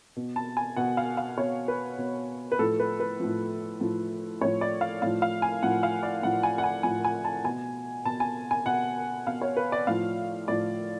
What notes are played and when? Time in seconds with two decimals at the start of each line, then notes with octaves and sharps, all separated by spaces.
0.16 B2
0.36 A5
0.57 G#5
0.76 B2 F#5
0.97 F5
1.17 F5
1.38 B2 C#5
1.68 B4
1.98 B2
2.52 B4
2.59 A2 F3 A4
2.80 B4
3.00 B4
3.20 A2 F3
3.81 A2 F3
4.41 A2 F3 C#5
4.61 D5
4.81 F5
5.02 A2 F3 F5
5.22 F5
5.42 G#5
5.63 A2 F3 F#5
5.83 F5
6.03 D5
6.23 A2 F3 F#5
6.43 G#5
6.58 F#5
6.64 G#5
6.83 A2 F3 G#5
7.04 G#5
7.24 A5
7.44 B2 G#5
8.05 B2 A5
8.20 G#5
8.51 G#5
8.66 B2 F#5
9.27 B2 F5
9.41 C#5
9.57 B4
9.72 D5
9.87 A2 F3 F5
10.48 A2 F3 D5